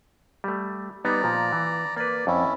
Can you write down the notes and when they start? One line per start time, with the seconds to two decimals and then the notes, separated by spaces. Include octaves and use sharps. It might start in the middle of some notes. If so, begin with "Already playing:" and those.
0.44 G3 A3
1.05 G3 B3 D#4 D5 A#5
1.24 A#2 F3
1.52 E3
1.96 A#3 B4 D5
2.27 F2 C#4 E4